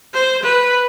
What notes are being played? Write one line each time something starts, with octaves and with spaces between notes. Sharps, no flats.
C5
B4